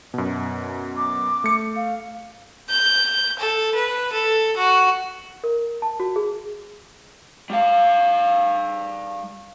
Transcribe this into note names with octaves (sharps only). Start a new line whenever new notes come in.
F#2 B2
D6
A3 C#7
F5
G6
A4
B4
A4
F#4
A#4
A5
F#4
G#4
G3 F5